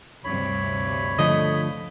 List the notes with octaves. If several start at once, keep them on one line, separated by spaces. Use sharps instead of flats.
D2 G2 C3 C#5 B5
D3 F3 A3 D#5